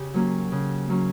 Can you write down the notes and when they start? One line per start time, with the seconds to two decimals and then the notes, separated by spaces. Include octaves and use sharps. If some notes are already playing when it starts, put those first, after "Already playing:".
Already playing: C#3 G4
0.14 F#3 A#3 C#4
0.52 C#3
0.89 F#3 A#3 C#4